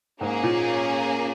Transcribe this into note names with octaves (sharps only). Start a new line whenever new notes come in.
G#2 A#3 C#4 G#4
A#2